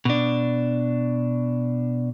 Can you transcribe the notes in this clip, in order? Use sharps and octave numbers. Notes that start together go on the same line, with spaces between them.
B2 D4